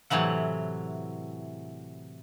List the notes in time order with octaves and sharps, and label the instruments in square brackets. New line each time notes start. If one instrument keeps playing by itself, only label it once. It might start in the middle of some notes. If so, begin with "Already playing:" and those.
[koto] A2 C3 E3 F#3 F#5